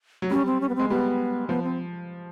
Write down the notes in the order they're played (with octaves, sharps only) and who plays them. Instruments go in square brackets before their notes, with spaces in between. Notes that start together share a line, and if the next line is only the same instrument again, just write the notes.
[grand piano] F#3
[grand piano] G3 [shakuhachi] C#4
[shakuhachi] C4
C#4
B3
[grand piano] G#3 [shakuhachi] C4
[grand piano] G3 [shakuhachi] B3
[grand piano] F3 [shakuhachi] B3
[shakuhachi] C4